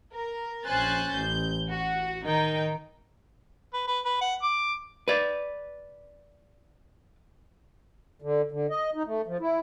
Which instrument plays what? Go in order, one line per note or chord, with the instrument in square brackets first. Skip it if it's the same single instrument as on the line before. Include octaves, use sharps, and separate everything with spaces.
[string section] A#4
A#1 C#4 C5 G#5 F#6 A6
A1 G6
F#4
D#3 D#4 G5
[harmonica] B4
B4
B4
F#5
D6
[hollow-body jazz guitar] B4 D5
[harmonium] D3
D3
D#5
D#4
A3
F3
E4